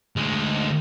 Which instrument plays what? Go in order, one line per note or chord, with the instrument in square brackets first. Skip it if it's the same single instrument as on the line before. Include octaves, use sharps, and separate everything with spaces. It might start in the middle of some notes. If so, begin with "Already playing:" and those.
[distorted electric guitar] D2 G#3